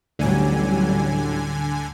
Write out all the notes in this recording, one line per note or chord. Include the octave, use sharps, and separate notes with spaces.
A1 D2 D3 F#3 G3 G#5